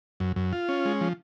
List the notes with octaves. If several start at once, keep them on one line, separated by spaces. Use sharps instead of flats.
F#2
F#2
F4
C#4
G#3
F3